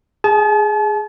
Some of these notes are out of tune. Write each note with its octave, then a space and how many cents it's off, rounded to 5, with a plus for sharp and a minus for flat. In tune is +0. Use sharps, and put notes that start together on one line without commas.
G#4 +0 A5 -40